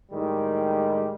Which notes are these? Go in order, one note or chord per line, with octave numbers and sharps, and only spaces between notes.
A2 D#3 G3 G#3